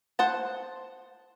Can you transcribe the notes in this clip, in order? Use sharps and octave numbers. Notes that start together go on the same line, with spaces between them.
C5 F#5 A5